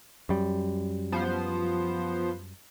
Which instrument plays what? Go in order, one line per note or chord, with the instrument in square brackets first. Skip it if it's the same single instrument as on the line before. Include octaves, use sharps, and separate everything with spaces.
[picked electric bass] F#2 G3
[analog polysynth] F3 B3 C5